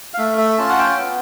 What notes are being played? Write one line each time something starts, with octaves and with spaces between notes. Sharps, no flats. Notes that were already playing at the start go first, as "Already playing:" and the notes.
F5
A3 E5
E5
C#4 F4 A5
F#5
G5
B3